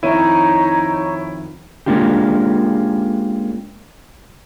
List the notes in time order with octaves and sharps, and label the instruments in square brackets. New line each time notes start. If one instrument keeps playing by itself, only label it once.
[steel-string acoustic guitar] F2 D#3 [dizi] D#4 [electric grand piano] E4 D#7 [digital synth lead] C#5
[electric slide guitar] G#3 A#3 C#4 D4 F4 G4